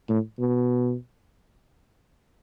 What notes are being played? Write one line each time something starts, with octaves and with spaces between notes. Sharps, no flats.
A2
B2